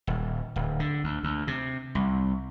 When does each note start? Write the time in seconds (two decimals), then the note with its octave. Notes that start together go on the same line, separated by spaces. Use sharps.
0.07 D#1
0.56 D1
0.80 D3
1.04 D2
1.23 D2
1.47 C3
1.95 C2